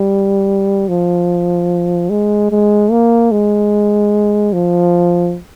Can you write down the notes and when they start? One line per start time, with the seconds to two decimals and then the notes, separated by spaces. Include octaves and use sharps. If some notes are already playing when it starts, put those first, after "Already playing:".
Already playing: G3
0.88 F3
2.10 G#3
2.51 G#3
2.91 A#3
3.31 G#3
4.53 F3